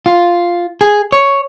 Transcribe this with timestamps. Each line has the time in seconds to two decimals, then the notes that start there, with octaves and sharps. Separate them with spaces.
0.06 F4
0.81 G#4
1.12 C#5